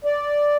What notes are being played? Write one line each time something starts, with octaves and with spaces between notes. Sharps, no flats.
D5